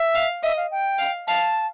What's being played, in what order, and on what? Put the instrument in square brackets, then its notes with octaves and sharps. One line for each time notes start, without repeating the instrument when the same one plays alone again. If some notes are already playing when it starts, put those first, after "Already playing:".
Already playing: [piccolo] E5
[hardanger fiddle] F5
[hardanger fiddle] D#5 [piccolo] E5
[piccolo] F5
G5
[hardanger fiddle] F5
[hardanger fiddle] F5 [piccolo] A5